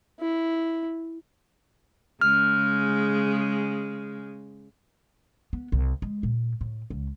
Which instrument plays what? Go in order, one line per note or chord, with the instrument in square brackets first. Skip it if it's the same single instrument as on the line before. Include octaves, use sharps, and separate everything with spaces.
[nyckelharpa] E4
[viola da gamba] C#3 G#3 [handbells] F6
[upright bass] B3
C2
G#3
A#2
A2
C#2